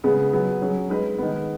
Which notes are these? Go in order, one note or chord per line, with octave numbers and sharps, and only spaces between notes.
C#3 G#3 B3 G#4
F#3 B3 G#4
F#3 C#4 G#4
G#3 D#4 B4
D#3 G#3 B3